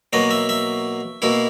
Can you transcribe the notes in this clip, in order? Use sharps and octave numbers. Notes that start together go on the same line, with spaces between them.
B2 F#3 A#3 D#5
E5
E5
B2 A#3 E4